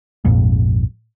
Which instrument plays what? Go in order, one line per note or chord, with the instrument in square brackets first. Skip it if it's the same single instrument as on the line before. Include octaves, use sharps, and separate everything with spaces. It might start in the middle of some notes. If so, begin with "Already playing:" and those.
[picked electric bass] A#1 F2 G#2